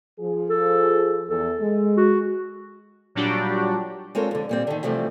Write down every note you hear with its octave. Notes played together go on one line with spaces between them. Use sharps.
F3 G#4
A4
E2 A4
G#3
F#4
A#2 F#3 G3 D4 F#4 G4
G#3 C4 F4 A4 A#4 C#5
F2 D3
A#2 G3 C4
D3 D#3
C3 E3 F3 G3 A3